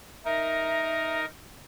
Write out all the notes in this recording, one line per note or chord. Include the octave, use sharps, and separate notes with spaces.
D#4 A#4 E5